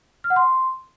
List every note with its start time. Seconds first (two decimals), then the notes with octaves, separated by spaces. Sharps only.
0.24 F6
0.30 F#5
0.36 C6